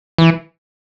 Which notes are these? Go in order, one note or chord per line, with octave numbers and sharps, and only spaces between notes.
E3